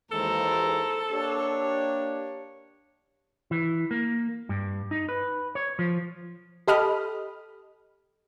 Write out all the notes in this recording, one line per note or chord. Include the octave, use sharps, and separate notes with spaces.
D#2 E3 G#3 A4 A#4 C5
A#3 D4 G4 C#5
E3
A#3
G2
D#4
B4
C#5
F3
G4 A4 D#5 B5 D#6 F6